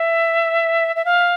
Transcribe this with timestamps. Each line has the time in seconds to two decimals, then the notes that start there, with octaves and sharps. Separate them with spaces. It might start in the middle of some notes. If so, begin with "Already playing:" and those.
Already playing: E5
0.96 E5
1.05 F5